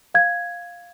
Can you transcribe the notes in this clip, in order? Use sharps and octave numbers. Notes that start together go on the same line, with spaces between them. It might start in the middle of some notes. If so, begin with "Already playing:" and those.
F5 G#6